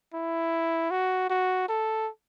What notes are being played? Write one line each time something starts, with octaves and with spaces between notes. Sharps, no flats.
E4
F#4
F#4
A4